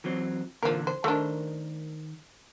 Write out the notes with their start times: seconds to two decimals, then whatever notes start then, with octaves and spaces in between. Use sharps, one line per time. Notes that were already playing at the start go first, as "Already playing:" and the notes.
0.04 E3 F#3 C4
0.63 A#2 D3 E3 F3 A#4
0.87 C5
1.04 D#3 A3 D4 A#4 C5